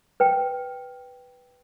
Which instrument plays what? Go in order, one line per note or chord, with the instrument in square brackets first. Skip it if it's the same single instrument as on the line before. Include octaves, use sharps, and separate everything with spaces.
[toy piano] B4 G5